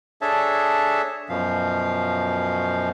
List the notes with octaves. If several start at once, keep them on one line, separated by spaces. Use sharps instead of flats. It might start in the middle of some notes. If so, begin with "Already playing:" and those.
D4 G#4 A4 C#5 E5 A5
F#2 B2 F3 F5